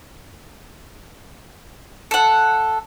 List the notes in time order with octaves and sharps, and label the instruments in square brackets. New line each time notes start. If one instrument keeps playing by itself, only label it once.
[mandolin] A4 F#5